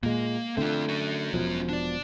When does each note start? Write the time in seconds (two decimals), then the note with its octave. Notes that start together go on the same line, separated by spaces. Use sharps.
0.03 A#2 G#3 A#3
0.57 D3 A3 C4 F4
0.89 C#4 F#4
1.34 E1 B2 F3
1.69 D4 D5